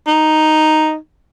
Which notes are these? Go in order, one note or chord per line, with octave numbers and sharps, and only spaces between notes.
D#4